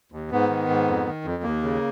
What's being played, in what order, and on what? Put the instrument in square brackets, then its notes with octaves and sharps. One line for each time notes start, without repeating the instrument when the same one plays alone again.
[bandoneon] D#2
G#2 B3
D#3
G#2
F2
D#3
F2
D#2 A#3
C#3